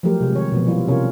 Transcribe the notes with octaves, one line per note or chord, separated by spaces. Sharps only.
F3 F#3 A3 G4 A#4
C3 G#3
D#3 C#5
B2 F3 B3
F3 G3 E4 F4
C3 C#4 F4 A#4 C#5